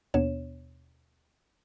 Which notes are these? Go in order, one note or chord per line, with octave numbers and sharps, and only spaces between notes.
D#2 B2 B3 D4 C#5 E7